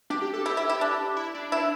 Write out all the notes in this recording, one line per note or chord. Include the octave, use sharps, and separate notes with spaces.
D4 G4
G4
A4
E4 G4
E4
E4
D4
E4
D4
E4